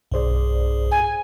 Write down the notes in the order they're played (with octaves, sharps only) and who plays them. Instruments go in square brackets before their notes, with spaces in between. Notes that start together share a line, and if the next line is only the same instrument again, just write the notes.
[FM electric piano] B1 C5 D5 [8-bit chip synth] G2 G#4
[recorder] G#5